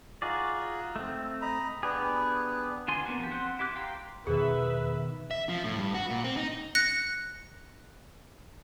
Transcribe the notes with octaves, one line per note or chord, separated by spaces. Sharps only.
D#4 F4 F#4 G#4 D5
A3 C4
D#5 A#5 B5
B3 D4 G4 G#4 B4
D3 F4 G#5 C6
A#3 B3 D4 F#4
F3 G4
C4 F#5 C6 F#6
E4 G4 D6 F#6
F5 G5 A#5 C6
E2 B2 D#3 G#4 B4 E5
E5
F3
A2
G2
F#4
A#2
C4
D#4
F#6 A#6 C#7